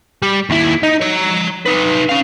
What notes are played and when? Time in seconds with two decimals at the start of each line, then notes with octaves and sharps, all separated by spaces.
0.23 G3
0.50 D#2 E4
0.83 D#4
1.01 C#5 A#5
1.66 D#4 B4
2.09 C#4 F5